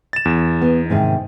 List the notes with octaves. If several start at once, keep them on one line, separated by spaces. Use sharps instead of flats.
A6 E7
E2
B3
G#2 C3 D#3